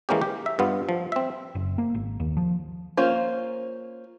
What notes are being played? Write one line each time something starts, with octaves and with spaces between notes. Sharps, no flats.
E3 G#3 A#3 C#4 G4
G4
E5
G2 B3 F4
F3
C4 E5
F#1
A#3
G#1
D#2
F3
A#3 C#4 F4 C5